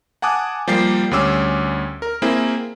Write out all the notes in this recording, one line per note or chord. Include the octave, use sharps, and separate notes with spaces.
F#5 G#5 A5 D6 D#6 F#6
F3 G3 A#3 G4 C7
D2 G3 C#4 D6 E6
A#4
A#3 C4 E4 G#4